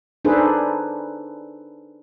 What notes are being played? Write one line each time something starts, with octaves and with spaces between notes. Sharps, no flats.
D4 D#4 G#4 A4 B4 C5